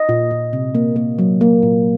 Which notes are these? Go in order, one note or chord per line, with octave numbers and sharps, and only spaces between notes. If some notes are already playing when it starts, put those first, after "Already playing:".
Already playing: D#5
A#2
A#2
C3
A#3
A#3
F#3
A#3
A#2